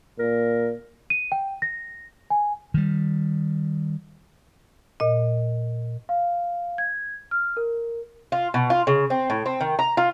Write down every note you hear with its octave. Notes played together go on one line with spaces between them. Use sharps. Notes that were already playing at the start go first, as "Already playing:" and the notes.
A#2 A#4
D#7
G5
A#6
G#5
D#3 G3
A#2 D#5
F5
G#6
F6
A#4
F4
B2
F4
C#3
C4
A2
C4
D#3
A#5
F4